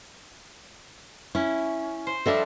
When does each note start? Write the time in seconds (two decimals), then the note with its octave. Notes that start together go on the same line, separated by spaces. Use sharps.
1.35 C#4 E4
2.07 C5
2.26 F3 G3 D4 A4 D#5 E5